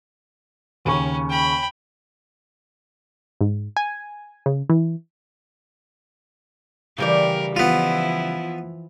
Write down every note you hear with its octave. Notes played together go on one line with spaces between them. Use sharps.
D#2 C#3 C#4 C#6
G5 B5
G#2
G#5
C#3
E3
C#3 E3 G3 A#4 D5
E3 F3 B3 E4 F4